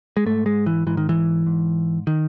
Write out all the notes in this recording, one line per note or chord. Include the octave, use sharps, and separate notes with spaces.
G#3
G#2 A3
G#3
E3
G#2 E3
D#3
E3
G#2
D#3